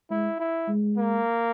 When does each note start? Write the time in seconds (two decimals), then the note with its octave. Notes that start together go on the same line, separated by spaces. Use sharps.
0.10 G#3 E4
0.40 E4
0.68 G#3
0.98 A#3